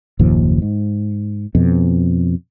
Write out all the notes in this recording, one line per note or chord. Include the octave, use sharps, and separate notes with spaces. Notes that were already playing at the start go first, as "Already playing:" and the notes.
F#1 D#2 A#2 F3
G#2
F2 B2